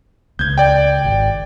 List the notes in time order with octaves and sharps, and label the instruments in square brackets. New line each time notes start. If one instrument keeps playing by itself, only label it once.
[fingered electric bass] C#2 [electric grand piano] G6 G#6
[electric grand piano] D5 G5
[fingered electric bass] G#1